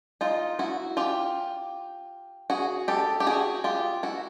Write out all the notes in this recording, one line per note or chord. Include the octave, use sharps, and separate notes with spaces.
D#4 F4
E4 F#4
F4 G4
F#4 G#4
G4 A4
G4
F#4 G#4
F4 G4
E4 F#4